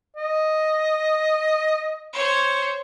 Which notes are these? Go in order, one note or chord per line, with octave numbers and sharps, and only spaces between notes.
D#5
C5 C#5